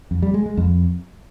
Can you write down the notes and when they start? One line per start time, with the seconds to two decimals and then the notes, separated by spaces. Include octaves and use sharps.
0.11 F2
0.22 G3
0.34 G#3
0.46 G#3
0.57 F2